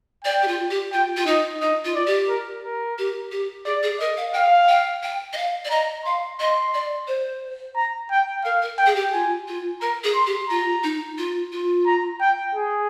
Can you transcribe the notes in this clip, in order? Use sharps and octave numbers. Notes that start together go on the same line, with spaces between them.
D5 G5
G4
F4
G4
F4 G5
F4
D#4 D#5
D#4 D#5
F4
D5
G4
A#4
A#4
G4
G4
G#4 D5
G#4
A#4 D#5
F5
F5 G5
G5
G5
D#5
F5
D5
D#5 A#5
F5 C6
D#5 C6
D5
C5
A#5
G5
A#4 F5
A#4
G5
G#4
G4
F4 G#5
F4
A#4 A#5
G#4
C6
G4
F4 A#5
D#4
F4
F4
A#5
G5
G#4